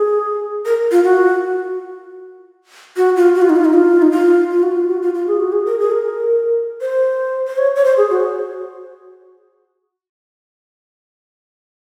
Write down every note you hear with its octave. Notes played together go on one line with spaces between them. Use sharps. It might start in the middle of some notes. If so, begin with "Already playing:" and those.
Already playing: G#4
A#4
F4
F#4
F#4
F4
F#4
F4
D#4
F4
D#4
F4
D#4
F4
F4
F#4
F4
F#4
F4
F4
G#4
F#4
G#4
A#4
G#4
A#4
C5
C5
C#5
C#5
C5
G#4
F#4